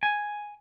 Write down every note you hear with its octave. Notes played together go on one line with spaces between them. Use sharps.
G#5